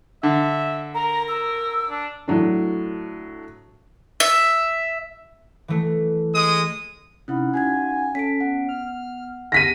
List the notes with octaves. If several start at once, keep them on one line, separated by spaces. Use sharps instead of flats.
D3 E5
A#4 A#5
E6
D4
A2 F#3 D4
E5
E3 A3
G#3 D#6
C3 C#4 D#4 E4 F#5 B5
C#4 D#4 F#4 F5 F#5 G#5 G#6
C#4 A4 A5 B6 D7
B3 F#5
F6
D3 B3 G4 A#6 B6 D#7